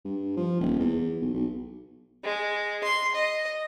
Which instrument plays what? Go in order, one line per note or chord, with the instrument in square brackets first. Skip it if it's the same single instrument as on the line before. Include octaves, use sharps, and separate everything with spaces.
[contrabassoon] G2
F3
D#1
E2
B1
B1
[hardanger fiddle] G#3
C6
D#5